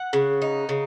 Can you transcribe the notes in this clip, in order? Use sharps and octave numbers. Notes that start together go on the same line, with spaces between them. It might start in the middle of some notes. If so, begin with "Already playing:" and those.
Already playing: F#5
C#3
D#4
C#3